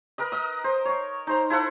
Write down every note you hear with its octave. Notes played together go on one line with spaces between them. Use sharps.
A#4 B4 D#5
D#5 D#6
C5
C#5 C#6
D#4 C5 A#5
E4 A4 C5 F#5